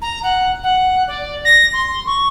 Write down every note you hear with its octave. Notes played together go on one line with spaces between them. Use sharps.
A#5
F#5
F#5
D5
A#6
C6
C#6